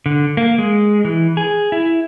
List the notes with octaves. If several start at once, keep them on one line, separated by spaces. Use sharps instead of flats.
D3
A#3
G#3
E3
G#4
E4